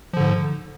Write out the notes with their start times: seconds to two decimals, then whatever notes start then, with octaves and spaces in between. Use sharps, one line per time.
0.13 F3
0.17 D3
0.20 G#2